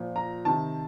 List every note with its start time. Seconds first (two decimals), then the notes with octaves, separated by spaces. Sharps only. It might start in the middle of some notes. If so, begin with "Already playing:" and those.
Already playing: A#2 F3
0.16 A#5
0.45 C3 D#3 A5